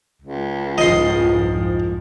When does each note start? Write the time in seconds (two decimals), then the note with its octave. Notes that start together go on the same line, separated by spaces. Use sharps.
0.22 C#2
0.78 C2 F2 G#2 F3 D#5 C6